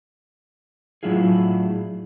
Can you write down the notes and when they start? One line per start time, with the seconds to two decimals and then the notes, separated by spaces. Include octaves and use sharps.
1.03 A2 F#3 D4 E4 F4 G#4